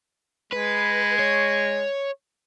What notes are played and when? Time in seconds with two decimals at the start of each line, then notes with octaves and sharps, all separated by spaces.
0.52 G#3 B4
1.19 C#5